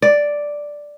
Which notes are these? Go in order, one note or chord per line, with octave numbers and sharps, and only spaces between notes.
D5